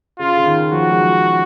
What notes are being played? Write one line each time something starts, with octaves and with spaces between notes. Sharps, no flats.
C#3 F4
C#3
D#3
F3 F#4
G#3
F#3